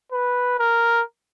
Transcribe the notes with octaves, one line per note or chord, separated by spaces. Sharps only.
B4
A#4